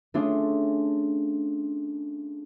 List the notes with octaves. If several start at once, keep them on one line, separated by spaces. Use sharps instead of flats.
A3 C#4 D4 F4 G#4